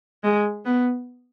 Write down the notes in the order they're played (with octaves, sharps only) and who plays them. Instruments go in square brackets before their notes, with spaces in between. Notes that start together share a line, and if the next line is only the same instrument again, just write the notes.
[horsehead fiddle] G#3
B3